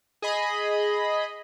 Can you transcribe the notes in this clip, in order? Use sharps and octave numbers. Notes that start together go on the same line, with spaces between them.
G#4 D#5 B5